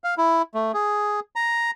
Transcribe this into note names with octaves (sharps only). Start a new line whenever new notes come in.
F5
E4
A3
G#4
A#5